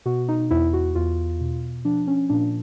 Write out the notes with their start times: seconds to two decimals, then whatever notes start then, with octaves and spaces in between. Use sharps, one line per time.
0.05 B2 F#4
0.28 D#4
0.51 E2 E4
0.73 F#4
0.95 E2 F4
1.40 B2
1.85 F3 D4
2.07 C#4
2.29 A#2 D4